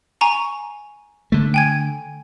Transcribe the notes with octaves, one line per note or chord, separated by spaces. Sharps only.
G#5 A#5 C#6
D3 A3
G5 G#5 G#6